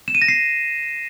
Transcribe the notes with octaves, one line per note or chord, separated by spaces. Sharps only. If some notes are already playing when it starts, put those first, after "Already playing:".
E7
D#7
A#6
C7